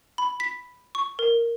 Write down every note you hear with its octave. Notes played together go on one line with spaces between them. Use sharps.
B5
B6
C#6
A#4